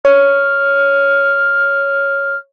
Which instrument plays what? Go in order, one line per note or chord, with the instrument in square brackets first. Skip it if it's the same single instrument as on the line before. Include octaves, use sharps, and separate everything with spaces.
[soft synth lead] C#5 [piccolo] F6